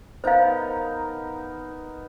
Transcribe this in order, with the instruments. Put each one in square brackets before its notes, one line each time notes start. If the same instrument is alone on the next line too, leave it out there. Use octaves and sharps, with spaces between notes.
[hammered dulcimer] B3 D#4 A#4 [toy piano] C5 F5